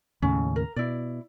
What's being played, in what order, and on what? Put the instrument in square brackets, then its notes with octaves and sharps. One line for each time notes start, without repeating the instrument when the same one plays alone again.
[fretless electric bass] D#2 A2 C#3 [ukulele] C#4
[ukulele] A#4
[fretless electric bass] B2 [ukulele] E4 D5